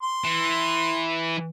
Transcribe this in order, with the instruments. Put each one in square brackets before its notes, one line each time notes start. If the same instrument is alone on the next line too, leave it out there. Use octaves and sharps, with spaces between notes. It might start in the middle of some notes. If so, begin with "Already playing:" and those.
[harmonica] C6
[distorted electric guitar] E3